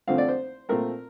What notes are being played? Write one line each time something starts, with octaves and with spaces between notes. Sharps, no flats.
F2 D3 F3 A3 C4 F5
D5
C5
A#1 A#2 A3 C4 A#4